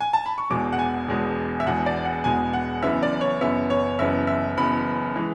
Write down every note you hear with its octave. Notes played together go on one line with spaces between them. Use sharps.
G#5
A5
B5
C#6
E1 E2 B2 G#3 D6
F#5
G#5
E1 E2 B2 G#3
E5
E1 E2 B2 G#3 F#5
D5
F#5
E1 E2 B2 G#3 G#5
F#5
F#1 F#2 E3 B3 E5
D5
C#5
F#1 F#2 E3 B3 E5
C#5
F#1 F#2 E3 B3 E5
E5
F#1 F#2 E3 B3 B5
E3 G#3